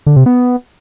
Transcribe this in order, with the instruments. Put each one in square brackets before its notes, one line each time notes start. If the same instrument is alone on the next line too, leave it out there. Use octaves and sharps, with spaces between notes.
[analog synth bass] D3
C3
B3